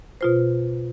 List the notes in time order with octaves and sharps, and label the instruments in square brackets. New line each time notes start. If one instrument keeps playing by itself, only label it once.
[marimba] B2 F4 C5